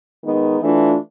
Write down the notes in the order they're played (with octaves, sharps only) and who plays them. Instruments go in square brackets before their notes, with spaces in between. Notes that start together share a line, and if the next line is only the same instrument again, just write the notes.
[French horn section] D#3 G#3 B3 D#4
E3 A3 D4 F4